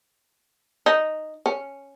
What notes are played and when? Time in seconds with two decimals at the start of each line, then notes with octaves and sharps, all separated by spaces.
0.86 D#4
1.46 C#4